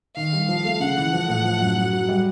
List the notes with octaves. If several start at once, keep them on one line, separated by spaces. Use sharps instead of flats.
D#3 F5
G3
F3
A3
C#3 F#5
E3
F3
A2
F3
F#2
F#3
F#3
G3